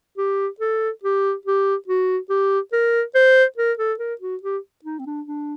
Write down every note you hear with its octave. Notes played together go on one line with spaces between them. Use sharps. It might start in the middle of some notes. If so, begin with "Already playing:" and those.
G4
A4
G4
G4
F#4
G4
A#4
C5
A#4
A4
A#4
F#4
G4
D#4
C4
D4
D4